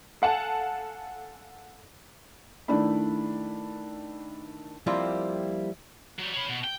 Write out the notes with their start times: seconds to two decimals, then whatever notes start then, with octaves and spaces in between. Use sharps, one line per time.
0.22 A4 F5 F#5 G#5 A5
2.68 D#3 A3 D4 E4 D5 B5
4.87 F3 G3 A#3 C4 E4 F4
6.19 F#3 G3
6.34 C#5 B5
6.49 B2
6.64 G5